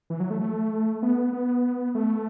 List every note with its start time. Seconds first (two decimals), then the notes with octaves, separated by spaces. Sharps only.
0.10 E3
0.20 F#3
0.30 A3
0.41 A3
1.03 B3
1.33 B3
1.95 A3